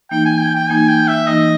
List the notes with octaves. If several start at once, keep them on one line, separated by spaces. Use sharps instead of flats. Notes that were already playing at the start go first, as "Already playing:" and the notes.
E3 A#3 D#4 G5
G#5
G5
G5
E3 A#3 D#4 G#5
G5
E5
E3 A#3 D#4 D#5